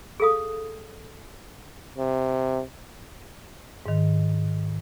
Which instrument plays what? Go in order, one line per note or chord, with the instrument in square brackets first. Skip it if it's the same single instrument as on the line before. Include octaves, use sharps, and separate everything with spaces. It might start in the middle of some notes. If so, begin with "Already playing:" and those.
[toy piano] G#4 A4 F5 D#6
[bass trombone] C3
[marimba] G#2 D#3